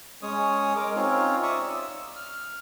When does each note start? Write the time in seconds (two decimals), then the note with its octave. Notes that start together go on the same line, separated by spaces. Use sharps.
0.22 G#3 C#4 C#5 D#6
0.76 G#3 A#4 D6
0.96 C4 C#4 D#4 F4 C#5
1.43 D5 E5 C#6 D#6
1.60 E6
2.16 F6